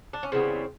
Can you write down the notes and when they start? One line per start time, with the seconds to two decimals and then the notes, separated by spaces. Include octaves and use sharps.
0.13 D4
0.23 C#4
0.32 C#3 E3 G3 B3 C4